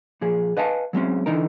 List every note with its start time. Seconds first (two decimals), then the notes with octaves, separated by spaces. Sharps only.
0.21 A#2 F3 G#4
0.57 B4 D#5 F5 G#5 A5
0.93 F#3 G#3 C4 C#4
1.26 D3 E3 D#4 A#4